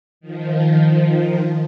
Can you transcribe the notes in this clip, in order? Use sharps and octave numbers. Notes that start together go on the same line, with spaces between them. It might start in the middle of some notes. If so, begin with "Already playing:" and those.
D#3 F3